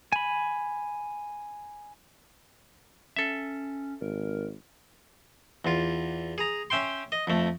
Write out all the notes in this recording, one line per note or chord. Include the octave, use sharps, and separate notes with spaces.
G#5 B5
C#4 A4 E5
G#1 A#4
E2 F4
G#4 A#5
C#4 E5 G5 C6
D#5
F2 A3